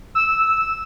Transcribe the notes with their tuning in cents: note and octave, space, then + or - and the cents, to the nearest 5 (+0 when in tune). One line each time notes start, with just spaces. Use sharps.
E6 -10